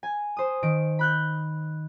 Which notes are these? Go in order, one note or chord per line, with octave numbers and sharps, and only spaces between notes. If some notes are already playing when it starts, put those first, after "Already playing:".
G#5
C5 D#6
D#3 D7
B5 F#6 G6